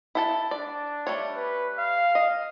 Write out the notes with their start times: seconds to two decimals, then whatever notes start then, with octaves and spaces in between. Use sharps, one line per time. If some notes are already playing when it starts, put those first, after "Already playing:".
0.15 E4 A4 A5
0.51 D4 D5
1.07 G3 A3 C#5
1.36 B4
1.79 F5
2.15 D#5